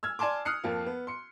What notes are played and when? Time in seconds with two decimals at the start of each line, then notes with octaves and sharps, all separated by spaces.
0.03 E6 F6 G#6
0.19 D5 G#5 A5 C6 D6
0.45 D#6 F6 F#6 C7 C#7
0.64 F2 F3 A#3
0.87 B3
1.07 C6 C#7